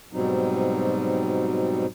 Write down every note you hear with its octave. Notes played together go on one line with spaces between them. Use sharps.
G#2 B2 F#3 G3 C4 D#4